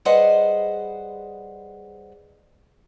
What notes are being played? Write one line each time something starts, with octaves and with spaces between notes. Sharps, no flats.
G3 G#4 B4 C5 D#5 F#5